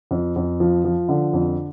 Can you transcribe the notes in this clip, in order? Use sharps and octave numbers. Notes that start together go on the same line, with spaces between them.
F2
F2
F3
F3
D3
F2